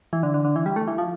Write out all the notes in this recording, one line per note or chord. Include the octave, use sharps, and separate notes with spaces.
E3
D3
D3
D3
E3
G3
A3
E3
F3